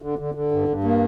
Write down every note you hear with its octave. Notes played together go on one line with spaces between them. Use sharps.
D3
D3
D3
G2
G2
A#3